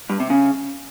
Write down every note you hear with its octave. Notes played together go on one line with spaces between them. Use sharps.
G2
C3
C#3